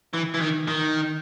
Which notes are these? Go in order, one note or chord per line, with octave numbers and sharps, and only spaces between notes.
E3
E3
D#3
D#3